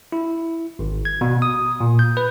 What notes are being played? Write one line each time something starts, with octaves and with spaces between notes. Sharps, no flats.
E4
G#1
G#6
B2
D#6
A#2
G6
B4